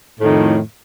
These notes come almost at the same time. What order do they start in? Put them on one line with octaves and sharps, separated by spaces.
A2 F2 D#3